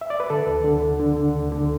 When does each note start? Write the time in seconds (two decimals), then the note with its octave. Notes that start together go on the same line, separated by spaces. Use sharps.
0.01 E5
0.10 D5
0.20 B4
0.30 D3 A4
0.47 D2
0.64 D3
0.82 D3
1.00 D3
1.16 D3
1.34 D2
1.52 D3